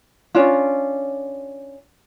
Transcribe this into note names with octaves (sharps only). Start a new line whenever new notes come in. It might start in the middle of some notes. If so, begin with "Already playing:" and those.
C#4 D4 F4